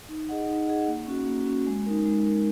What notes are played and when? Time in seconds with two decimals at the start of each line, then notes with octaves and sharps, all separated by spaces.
0.09 D#4
0.29 G#4 D#5 F#5
0.47 D#4
0.68 G#4 D#5 F#5
0.87 A#3
1.07 C#4 F#4
1.26 A#3
1.46 C#4 F#4
1.67 G#3
1.86 D#4 A#4
2.05 G#3
2.25 D#4 A#4